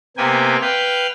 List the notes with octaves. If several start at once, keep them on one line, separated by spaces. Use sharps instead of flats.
C3 A#3 B3 G5 G#5
B4 F5 G5 G6